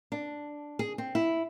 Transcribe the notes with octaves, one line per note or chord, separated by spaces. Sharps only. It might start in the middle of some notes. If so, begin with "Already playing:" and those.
D4
G#4
C4
E4